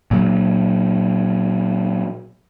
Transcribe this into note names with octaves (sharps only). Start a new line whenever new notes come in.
A#2 F#3